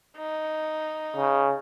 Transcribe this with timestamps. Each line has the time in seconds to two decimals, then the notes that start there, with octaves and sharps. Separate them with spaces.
0.17 D#4
1.17 C#3